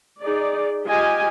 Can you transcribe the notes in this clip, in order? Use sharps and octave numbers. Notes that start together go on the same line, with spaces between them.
D#4 G#4 D5
F4 G4 D#5 G#5